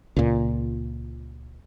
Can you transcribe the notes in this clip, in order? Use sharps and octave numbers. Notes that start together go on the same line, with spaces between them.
C#2 A#2